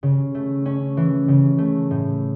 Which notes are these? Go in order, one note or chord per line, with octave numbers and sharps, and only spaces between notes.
C#3
A3
C#4
E3
C#3
A3
A2